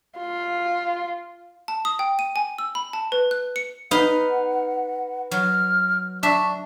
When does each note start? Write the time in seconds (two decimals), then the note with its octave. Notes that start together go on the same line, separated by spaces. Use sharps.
0.18 F4
1.68 A5
1.85 D#6
1.99 G5
2.19 D#7
2.36 G#5
2.58 E6
2.75 B5
2.93 A5
3.12 B4
3.31 F#6
3.56 C#7
3.91 D#4 B4 F5 F#5
5.31 F#3 F6
6.23 D4 E5 C#6